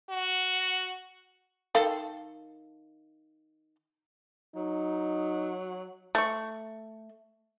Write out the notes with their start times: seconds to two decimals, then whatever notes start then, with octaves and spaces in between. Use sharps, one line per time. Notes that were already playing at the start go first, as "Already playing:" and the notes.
0.10 F#4
1.75 D#3 A4 F5
4.56 F#3 D#4
6.15 A3 C#6